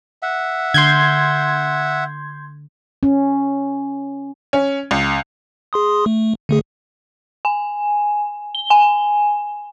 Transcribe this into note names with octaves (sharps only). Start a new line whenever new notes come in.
E5 F#5
D3 C6 G6 G#6
C#4
C#4
C#2
G#4 C6 D#6
A3
D3 A3 G#4
G#5
G7
G#5